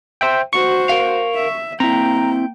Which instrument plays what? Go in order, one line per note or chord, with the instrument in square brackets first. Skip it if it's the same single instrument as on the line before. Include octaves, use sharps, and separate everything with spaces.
[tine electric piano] C5 E5 G5
[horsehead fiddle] F#4 C5 [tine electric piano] C#6
[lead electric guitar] A#4 F5
[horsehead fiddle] E5
[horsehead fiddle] A#3 G5 [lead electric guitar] C4 E4 [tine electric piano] A#5